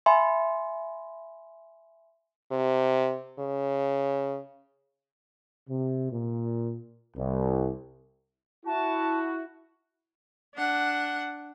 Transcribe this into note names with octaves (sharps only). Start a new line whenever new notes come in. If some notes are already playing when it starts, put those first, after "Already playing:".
E5 G#5 B5 C6
C3
C#3
C3
A#2
C2
E4 F#4 A5
D4 F#5